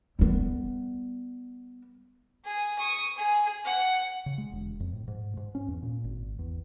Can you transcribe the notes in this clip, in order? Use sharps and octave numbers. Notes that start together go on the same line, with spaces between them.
G3 B3
G#4
C#6 D#6
G#4
F#5
C#3
G#3
E1
F2
A2
G#2
G#2
C#4
E2
A#2
G#1
E2